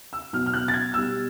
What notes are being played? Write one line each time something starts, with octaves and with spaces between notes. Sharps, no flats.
E6
B2 F#3 F6
F6
F#6
A6
G#6
B2 G3 E6